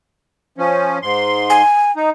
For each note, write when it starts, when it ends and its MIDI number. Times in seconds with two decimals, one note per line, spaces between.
0.58 0.98 53
0.58 0.98 61
1.02 1.62 44
1.02 1.62 84
1.50 1.91 80
1.96 2.10 63